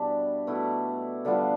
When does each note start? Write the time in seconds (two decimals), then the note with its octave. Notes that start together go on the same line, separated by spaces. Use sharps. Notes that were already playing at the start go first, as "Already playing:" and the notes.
Already playing: B2 G3 D4 E4 G4
0.47 B2 A3 E4
1.25 D3 G3 B3 F4